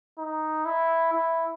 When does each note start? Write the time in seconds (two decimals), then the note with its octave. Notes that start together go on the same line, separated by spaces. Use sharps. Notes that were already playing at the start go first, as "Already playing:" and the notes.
0.18 D#4
0.65 E4
1.13 E4